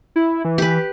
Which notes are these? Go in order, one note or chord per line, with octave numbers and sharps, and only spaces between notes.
E4
E3
G4 B4